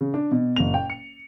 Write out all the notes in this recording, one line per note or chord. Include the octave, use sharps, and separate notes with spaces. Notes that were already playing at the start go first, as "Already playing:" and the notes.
C#3
D4
B2
F#1 A#2 F7
G5
C#7